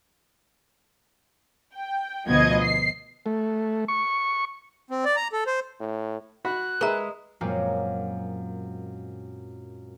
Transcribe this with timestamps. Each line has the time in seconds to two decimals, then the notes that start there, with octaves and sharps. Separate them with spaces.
1.75 G5
2.27 D2 B2 F3 B3 D#5 G#6
2.63 C7
3.26 A3
3.88 C#6
4.91 C4
5.05 D5
5.16 A#5
5.33 A4
5.47 C5
5.80 A2
6.45 F#4 B5 F#6
6.81 G#3 A#4 B4 E5 A#5
7.41 F#2 A#2 F#3 G#3 A#3 C4